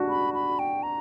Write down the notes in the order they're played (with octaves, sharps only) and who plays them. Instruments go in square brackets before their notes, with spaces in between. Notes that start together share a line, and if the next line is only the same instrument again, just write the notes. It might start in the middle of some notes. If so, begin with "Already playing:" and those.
Already playing: [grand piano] D4 F#4
[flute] B5
B5
G5
A#5